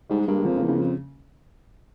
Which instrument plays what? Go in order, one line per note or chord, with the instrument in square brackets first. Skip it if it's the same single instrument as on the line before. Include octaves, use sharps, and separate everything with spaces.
[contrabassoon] G#2 [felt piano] G3
[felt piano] G#3
[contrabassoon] G2 [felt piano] A#3
[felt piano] G#3
[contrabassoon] F2 [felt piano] F3
[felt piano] C#3
[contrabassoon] E2
[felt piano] C#3
[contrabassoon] F2